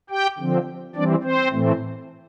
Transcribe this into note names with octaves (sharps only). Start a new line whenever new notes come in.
G4 G5
D3 F3 C4
E3 G3 C4 D4 D5
C4 C5
A2 E3 A3 C4